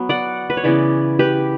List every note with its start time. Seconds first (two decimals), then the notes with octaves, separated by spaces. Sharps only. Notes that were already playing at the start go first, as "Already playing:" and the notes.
Already playing: F#3 B3
0.09 D5 F#5
0.50 B4
0.57 C#5
0.64 C#3 E3 B3 B4 D5
1.19 G4 B4